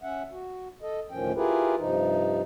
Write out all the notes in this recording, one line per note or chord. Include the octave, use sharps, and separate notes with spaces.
C#4 E5 F#5
F#4
A4 D#5
D2 A2 D#3 F3 C#4 G5
E4 F4 G4 G#4 A#4 B4
G2 C3 F3 D#4